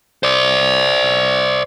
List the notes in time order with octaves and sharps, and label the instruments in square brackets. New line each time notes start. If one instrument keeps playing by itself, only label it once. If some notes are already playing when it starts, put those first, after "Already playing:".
[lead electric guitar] C5 D5